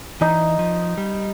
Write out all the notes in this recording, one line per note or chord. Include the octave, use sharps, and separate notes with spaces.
E3 D#4
F3
G3